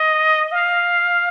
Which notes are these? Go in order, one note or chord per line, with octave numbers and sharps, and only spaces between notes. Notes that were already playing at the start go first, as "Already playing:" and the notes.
Already playing: D#5
F5